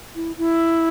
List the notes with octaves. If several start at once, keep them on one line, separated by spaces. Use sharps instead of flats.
E4
E4